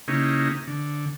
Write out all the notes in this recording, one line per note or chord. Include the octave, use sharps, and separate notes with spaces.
C#3 A#3 C#4 D#4 E4 G4
D3